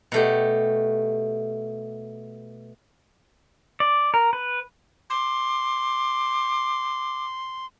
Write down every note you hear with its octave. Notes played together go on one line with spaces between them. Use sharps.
B2 A3 G4
D5
A#4
B4
C6 D6